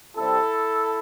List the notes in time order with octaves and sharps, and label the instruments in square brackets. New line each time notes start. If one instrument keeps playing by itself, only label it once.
[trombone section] C3 G3 C4 E4 A4